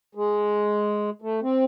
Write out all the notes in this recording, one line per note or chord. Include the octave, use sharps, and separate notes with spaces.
G#3
A3
C4